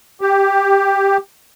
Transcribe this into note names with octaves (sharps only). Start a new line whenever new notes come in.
G4